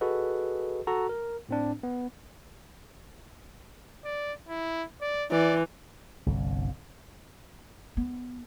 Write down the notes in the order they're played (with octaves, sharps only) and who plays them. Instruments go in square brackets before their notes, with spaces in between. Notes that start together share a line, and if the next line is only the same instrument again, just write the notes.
[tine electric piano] F#4 G#4 A4 B4 D#5
F#4 A4 A#5
A#4
A2 C4 D4
B3
[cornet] D5
E4
D5
[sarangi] E3 [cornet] D5
[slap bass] G1 C2
[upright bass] B3